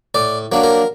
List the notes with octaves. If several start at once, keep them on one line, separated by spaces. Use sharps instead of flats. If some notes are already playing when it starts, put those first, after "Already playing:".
A2 D5
F#3 A#3 D4
A#4